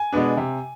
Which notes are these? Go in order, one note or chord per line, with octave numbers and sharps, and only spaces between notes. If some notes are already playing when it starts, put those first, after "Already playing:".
Already playing: G#5
B2 G#3 B3 D4
C3